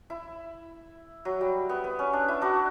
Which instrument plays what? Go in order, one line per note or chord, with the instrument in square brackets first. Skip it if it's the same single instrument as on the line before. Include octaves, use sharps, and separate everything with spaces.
[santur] E4
F#3
G3
B3
B3
C#4
D4
E4
D4 F#4